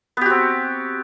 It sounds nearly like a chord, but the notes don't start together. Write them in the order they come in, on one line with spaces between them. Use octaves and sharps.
B3 G4 F#4 C4